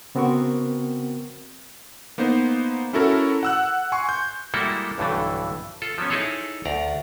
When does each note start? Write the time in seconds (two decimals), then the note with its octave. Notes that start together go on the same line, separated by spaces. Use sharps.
0.15 C#3 B3 C4 F#4 A#4 C#6
2.18 A#3 B3 D#4 C5
2.93 C#4 E4 F#4 A4 A#4
3.43 F#5 E6 F#6
3.92 G#5 C6 C#6
4.09 G6
4.54 G3 G#3 A#3 E4 F#4 A4
4.98 B1 G2 D3 E3 A3
5.82 F4 A4
5.98 F3 F#3 B3 C#4
6.10 D#4 E4 G#4 A4 C#5
6.65 D2 D5 A#5